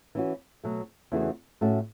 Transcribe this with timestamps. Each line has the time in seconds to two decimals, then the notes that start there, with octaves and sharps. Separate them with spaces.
0.15 E3 C#4 F#4
0.64 B2 F#3 A3
1.12 E2 C#3 E3 A3 F#4
1.61 A2 A3 C#4 F#4